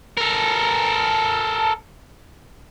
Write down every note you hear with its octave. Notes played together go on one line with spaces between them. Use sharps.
A4 A#4